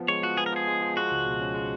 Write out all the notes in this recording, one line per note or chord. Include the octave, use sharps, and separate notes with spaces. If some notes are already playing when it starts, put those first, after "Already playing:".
Already playing: F3 B3
G#3 C#5
F3 F#4
B3 G#4
A#4
F3 G#4
G#3
F3
G#3 F#4
C#2
B2
C#4
G#3